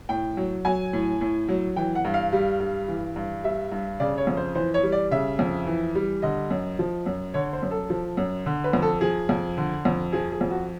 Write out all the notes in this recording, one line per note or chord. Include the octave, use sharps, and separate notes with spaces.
A2 G5
F#3
F#3 G#5
A2
A2
F#3
E3 G5
F#5
G2
F5
G3
G2
E3
G2
G3 E5
G2
C#3 D5
C#5
F2
C5
E3 C5
C#5
G3
D5
C#3 E5
F2
E3
G3
D3 D#5
F#2
F3
F#2
D3 C#5
C5
F#2
A4
F3
F#2
D3
B4
F2
A4
F3 G#4
F2
D3
F2
F3 G#4
G#4
F2
F#4